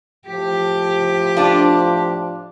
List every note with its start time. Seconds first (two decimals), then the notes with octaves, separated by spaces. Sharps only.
0.28 A2 F3 G4
1.37 D4 F4